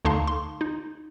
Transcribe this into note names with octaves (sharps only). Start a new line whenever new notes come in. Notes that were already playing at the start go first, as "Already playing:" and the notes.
D2 D3 D#4 F5 A5 C6
C6
D#4